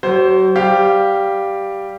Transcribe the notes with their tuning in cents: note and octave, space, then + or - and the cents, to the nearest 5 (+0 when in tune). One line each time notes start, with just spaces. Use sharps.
F#3 +35 C5 +0
G3 +0 G4 +0 F5 -5